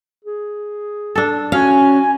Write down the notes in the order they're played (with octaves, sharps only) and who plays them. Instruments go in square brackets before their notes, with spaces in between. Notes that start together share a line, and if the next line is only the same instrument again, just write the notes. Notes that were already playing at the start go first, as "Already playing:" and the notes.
[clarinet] G#4
[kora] D4 A4
[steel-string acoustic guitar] C#4 [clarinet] F#4 [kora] F5 [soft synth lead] G#5